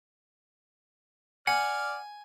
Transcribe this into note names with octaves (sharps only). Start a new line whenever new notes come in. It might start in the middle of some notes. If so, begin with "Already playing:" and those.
D5 F#5 G#5 F6